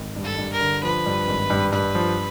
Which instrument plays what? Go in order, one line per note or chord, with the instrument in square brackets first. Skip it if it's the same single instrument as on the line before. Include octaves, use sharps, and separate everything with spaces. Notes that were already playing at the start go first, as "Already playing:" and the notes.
Already playing: [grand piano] G#1
G2
[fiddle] A4
[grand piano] G2
[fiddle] A#4
[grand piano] D3
[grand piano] F3 [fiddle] B4
[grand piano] G2
G#1
G2
[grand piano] G2 [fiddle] B4
[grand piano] F3